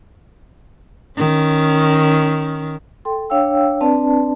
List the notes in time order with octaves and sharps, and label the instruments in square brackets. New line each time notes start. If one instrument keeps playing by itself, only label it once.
[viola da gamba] D#3 C#4
[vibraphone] A4 G5 C6
D4 C#5 F5 G5 E6
C4 D4 B4 D5 A5